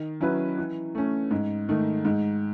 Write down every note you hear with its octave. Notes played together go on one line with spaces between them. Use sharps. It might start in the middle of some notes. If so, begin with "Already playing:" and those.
Already playing: D#3
F#3 C#4 E4 B4
E3
A3 C#4
G#2
D#3 A3
G#2